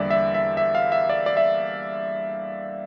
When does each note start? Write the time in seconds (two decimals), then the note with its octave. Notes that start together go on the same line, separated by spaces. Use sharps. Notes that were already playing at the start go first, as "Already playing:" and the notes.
Already playing: E2 D3 G3 A#3 D5 E5
0.10 E5
0.34 E5
0.57 E5
0.75 F5
0.92 E5
1.09 D5
1.26 D5
1.37 E5